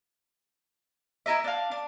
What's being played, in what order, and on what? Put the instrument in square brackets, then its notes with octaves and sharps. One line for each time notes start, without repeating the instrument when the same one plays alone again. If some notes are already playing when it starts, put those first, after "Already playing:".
[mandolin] E4 A#4 D#5 E5
D4 F5
D4